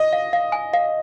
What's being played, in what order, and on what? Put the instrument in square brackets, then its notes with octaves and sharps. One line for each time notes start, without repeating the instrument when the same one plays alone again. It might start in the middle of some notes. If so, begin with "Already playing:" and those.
Already playing: [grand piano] D#5
[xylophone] F5
F5
G#5
F5